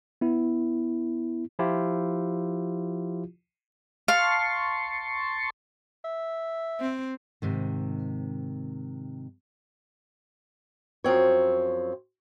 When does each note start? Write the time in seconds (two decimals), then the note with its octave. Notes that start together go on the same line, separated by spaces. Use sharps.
0.21 B3 E4
1.59 F3 E4 F4 G4
4.08 F5 A5 C6 C#6
6.04 E5
6.81 C4
7.42 G#2 C3 D#3
11.04 F#2 F3 C4 C#5